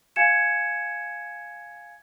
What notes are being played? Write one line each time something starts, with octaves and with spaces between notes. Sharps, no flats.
F5 G#5 G#6 C#7 E7